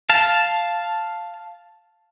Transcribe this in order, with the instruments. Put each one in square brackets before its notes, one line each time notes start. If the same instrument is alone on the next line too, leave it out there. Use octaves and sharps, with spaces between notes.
[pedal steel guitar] F5 A5